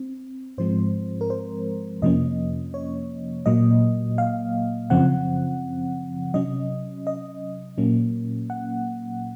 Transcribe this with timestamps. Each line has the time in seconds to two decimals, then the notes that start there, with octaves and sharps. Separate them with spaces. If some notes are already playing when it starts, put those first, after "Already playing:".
Already playing: C4
0.58 G#2 F3 G#3 C4 C5
1.21 A#4
1.30 C5
2.02 F2 C3 F3 A#3 C#4 D#5
2.74 C#5
3.46 A#2 F#3 A#3 D#5
4.18 F5
4.90 F#2 C#3 F3 C4 F#5
6.34 C3 F#3 C#4 D#5
7.07 D#5
7.78 A#2 F#3 A#3 C#4
8.50 F#5